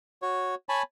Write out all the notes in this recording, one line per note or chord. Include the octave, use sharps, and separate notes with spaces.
F#4 C#5
C#5 G#5 A5 B5